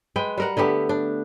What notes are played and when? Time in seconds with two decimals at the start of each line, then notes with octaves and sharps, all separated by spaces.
0.16 G#3 B4 G5
0.38 G3 A#4 F#5
0.57 D3 A3 B3 G4
0.89 D4